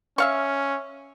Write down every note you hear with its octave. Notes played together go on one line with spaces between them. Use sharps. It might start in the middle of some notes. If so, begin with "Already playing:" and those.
C#4 E5 F5 C#6